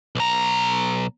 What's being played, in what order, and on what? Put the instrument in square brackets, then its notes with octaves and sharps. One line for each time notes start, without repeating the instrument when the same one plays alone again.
[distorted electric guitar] B1 A#5